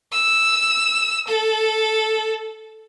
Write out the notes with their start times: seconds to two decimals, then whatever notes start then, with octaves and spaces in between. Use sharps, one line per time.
0.13 E6
1.27 A4